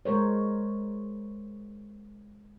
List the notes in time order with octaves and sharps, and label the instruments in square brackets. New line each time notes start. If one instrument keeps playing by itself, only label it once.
[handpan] G#3 A#4 C5 C#5